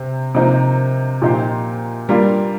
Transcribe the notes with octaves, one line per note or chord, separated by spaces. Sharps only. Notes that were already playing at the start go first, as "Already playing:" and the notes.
Already playing: C3
C3 F3 A#3 D#4 A#4
A#2 F3 D#4 G4 C5
G2 G3 A#3 F4